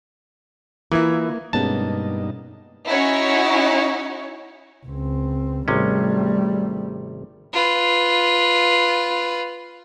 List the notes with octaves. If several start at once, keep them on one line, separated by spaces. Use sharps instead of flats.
E3 A#3 E4 F4 A#4 D#6 G#6
G2 B2 G#3 A#3 B3 C#4 D#4 A5
C#4 D#4 E4 F#4 C#5
C#2 C4
G#1 C3 G3 A3 C#4
F4 B4